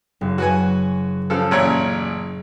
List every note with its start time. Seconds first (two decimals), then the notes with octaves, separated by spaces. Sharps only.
0.21 F#1
0.38 F#4 B4 G#5
1.30 C#3 F3 A4
1.51 A1 A#2 C#5